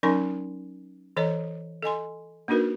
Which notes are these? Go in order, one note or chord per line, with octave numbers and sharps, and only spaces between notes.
F#3 C#4 D#4 A#4 G#5 C6
E3 A4 C5 C#5 D#5 A#5
A4 D#5 G#5 C6
A#3 D4 D#4 F#4 A#4 B4